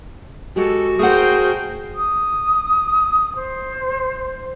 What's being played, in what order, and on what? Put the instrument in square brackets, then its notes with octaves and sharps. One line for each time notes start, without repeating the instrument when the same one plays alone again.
[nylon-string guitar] G#3 G4 [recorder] F#4 [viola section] A4
[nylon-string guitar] A3 F#5 [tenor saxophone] G#4 [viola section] A#4 C5 G5
[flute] D#6
C5